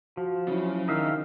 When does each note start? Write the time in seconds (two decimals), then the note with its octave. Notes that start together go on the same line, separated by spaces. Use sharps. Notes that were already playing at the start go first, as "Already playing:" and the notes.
0.17 F3 F#4
0.48 C#3 F#3 C#4 E4
0.88 D#3 D4 D#4 E5 F5